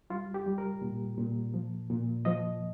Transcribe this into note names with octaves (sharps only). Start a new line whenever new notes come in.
G3 F4
G4
G3
A#4
A#2
A#2
F3
A#2
F3 D#5